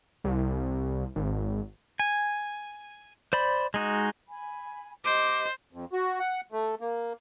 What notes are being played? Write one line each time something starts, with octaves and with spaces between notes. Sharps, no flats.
C2
G#1
G#5
C5 D5 B5
G#3 D#4 F#4
G#5 B5
G4 C5 D#5 D6
F2
F#4
F#5
A3
A#3